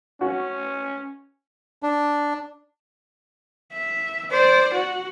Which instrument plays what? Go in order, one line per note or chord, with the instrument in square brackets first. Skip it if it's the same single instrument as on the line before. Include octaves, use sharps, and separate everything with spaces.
[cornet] C#4 [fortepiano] F#4
[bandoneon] D4
[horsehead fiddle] E5
C5 D5
F#4